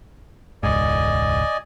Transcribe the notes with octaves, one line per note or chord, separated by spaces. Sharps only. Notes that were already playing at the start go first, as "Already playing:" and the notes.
E1 C#2 G#2 D5 D#5 G#5